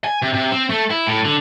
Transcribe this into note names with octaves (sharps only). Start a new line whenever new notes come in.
G#5
C3
C3
C4
A3
E4
A2
D3